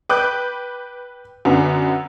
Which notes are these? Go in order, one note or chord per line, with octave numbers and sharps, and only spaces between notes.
B4 G5 D6 F#6 G6
F#2 D3 B3